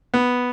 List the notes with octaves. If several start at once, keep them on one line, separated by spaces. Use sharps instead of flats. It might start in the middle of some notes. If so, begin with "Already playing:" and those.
B3